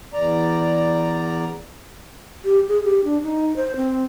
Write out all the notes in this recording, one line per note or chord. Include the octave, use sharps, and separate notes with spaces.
E2 D5 A#5
G4
G#4
G4
D4
D#4
C5
C4